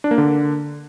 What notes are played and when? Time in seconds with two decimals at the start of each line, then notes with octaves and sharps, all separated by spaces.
0.04 D4
0.11 A#3
0.18 D3